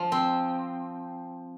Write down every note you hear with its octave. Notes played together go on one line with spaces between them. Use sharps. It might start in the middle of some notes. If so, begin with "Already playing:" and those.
Already playing: F3
C4